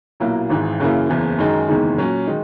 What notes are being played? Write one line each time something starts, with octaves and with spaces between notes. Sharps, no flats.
B1 A#2 F#3 A#3 E4
G#1 G#2 E3
F#2 C#3 E3 A#3 E4
F#1 E2 C#3 E3
F#2 D#3 G#3 D#4
F#1 E2 D#3 G#3 D#4
A#2 F#3 C#4
D#3 G#3 D#4